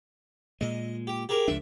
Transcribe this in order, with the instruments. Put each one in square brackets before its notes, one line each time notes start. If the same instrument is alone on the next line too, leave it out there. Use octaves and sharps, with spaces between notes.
[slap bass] A#2 G#3 [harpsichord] D#5
[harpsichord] G4
G4 G#4 A#4
[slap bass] C#2 F3 D4 [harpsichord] E5